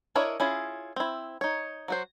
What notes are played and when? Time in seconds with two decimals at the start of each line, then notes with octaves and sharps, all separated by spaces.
0.15 D4 E4 A#4 C#5 D#5
0.40 C#4 E4 F4 G#4
0.96 C4 E4
1.41 D#4 C#5
1.88 F#3 F#4 C5